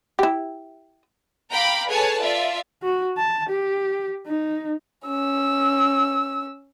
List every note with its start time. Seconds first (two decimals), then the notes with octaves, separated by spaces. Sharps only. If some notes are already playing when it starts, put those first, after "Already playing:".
0.19 E4 G4
1.50 F5 G5 A#5 B5 D6
1.87 G#4 A4 B4 C#5 G#5 A5
2.21 F4 D5 E5
2.83 F#4
3.17 A5
3.50 G4
4.27 D#4
5.07 C#4 E6